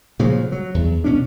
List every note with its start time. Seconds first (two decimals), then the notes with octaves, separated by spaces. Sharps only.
0.19 A#2 C#3 F3 F#3
0.52 F#3
0.74 E2
1.04 B2 C#4 D4